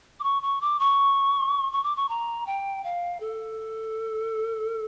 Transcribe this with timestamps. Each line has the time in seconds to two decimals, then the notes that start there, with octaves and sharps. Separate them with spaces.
0.20 D6
0.24 C#6
0.42 C#6
0.61 D6
0.80 C#6
1.73 C#6
1.84 D6
1.96 C#6
2.09 A#5
2.46 G5
2.84 F5
3.20 A4